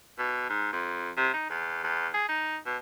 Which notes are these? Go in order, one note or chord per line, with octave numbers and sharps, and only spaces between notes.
B2
G#2
F2
C3
D#4
E2
E2
G#4
D#4
B2